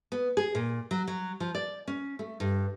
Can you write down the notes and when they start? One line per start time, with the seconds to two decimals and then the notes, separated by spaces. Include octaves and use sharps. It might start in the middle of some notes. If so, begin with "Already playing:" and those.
0.12 B3
0.37 G#4
0.55 A#2
0.91 F#3
1.07 F#3
1.40 F3
1.55 D5
1.88 C#4
2.19 A3
2.40 G2